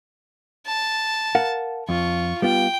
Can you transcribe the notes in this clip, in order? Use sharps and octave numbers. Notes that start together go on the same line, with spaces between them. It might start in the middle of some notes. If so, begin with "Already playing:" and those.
A5
A#4 F5 F#5
F2 F4 C#6
G3 B3 F4 G5